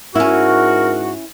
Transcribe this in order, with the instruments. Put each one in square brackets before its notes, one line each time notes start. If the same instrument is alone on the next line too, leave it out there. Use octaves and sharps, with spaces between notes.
[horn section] G#2 F#4 [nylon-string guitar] C#4 E4 [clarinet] A#4